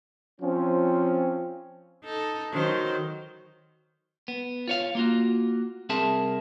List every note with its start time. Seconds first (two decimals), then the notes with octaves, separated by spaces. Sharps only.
0.41 F3 C4 C#4
2.04 D#4 A4
2.52 D#3 F#3 C5
4.28 B3
4.68 F4 C#5 F5
4.95 A#3 F4 F#4
5.89 C2 C4 G#4 A#4 E5 A5